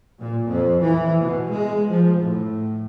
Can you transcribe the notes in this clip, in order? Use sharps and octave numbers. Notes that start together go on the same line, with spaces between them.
A#2
F2
E3
B2
G#3
F3
A2